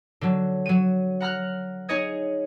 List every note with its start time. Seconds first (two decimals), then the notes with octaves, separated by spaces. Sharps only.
0.21 D3 F#3
0.66 F#3 D#7
1.20 F#5 A#5 F6 F#6
1.89 D#4 G#4 C#5 D#5 G#6